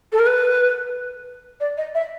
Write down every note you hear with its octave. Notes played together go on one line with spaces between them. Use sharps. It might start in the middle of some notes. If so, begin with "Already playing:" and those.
A4
A#4
B4
D5
D#5
E5